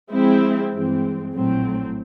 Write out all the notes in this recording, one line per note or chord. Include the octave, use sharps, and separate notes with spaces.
F3 G#3 C4 E4
G2 E3 G#3 C4
A#1 A2 F#3 A3 C4